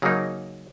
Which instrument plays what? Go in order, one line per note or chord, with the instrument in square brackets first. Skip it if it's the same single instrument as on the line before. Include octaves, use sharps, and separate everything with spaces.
[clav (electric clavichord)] C#3 F#3 A#3 D#4